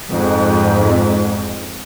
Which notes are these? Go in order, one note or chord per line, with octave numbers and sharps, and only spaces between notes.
F2 G#2